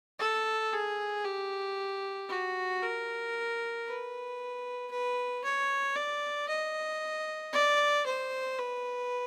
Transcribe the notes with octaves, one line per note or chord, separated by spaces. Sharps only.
A4
G#4
G4
F#4
A#4
B4
B4
C#5
D5
D#5
D5
C5
B4